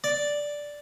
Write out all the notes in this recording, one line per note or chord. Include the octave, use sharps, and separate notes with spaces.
D5